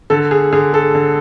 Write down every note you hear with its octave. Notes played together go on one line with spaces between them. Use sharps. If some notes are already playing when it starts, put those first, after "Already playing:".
D3 A4
G#4
D3 G#4
A4
D3